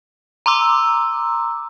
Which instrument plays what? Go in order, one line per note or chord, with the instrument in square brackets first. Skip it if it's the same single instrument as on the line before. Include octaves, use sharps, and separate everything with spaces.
[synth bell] A#5 C6 D6 E6